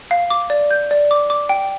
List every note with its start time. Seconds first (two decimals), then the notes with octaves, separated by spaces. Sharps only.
0.11 F5
0.30 D6
0.50 D5
0.71 G6
0.91 D5
1.11 D6
1.30 D6
1.49 G5